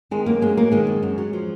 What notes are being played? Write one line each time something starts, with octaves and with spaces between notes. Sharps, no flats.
D#3 G#3
F#2 A#3
F#2 G#3
F#3 A#3
D#3 G#3
F#2
F#2
F#3
F3